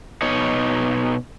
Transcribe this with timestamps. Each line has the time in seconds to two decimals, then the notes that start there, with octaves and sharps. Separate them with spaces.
0.22 B2 D#4 C#5